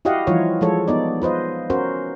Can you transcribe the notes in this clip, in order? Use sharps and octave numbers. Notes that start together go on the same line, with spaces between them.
E4 F#4 G4 D#5 F5 F#5
E3 F3 G3 D#4 F4 C#5
F3 G#3 A4 C#5
B3 D#4 D5
F4 B4 C5 D#5
C#4 F#4 A#4 C5